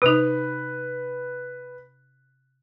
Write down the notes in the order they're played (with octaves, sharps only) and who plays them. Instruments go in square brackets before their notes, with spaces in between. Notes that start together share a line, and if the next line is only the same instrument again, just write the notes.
[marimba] C3 D#4 [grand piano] B4